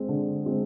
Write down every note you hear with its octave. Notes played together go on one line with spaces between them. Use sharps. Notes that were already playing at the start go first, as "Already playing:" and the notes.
Already playing: G#3 C4
D3
G#3 C4